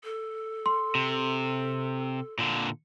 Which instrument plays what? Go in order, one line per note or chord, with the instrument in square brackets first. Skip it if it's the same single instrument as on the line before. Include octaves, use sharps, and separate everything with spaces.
[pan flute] A4
[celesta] C6
[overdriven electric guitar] C3
A#2 D3